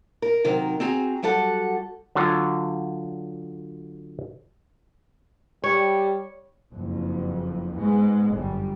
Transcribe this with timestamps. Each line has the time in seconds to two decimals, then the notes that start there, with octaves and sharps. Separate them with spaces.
0.22 A#4
0.44 C3 D#3 F#3 A#4
0.80 C4 F#4 G#4 A#5
1.23 F#3 G3 F#4 A4 F#5
2.15 D3 F#3 F4 C#5
5.64 G3 C#5
6.73 F#1 F2
7.76 G#2 G#3 B3
8.30 G1 F#2 G3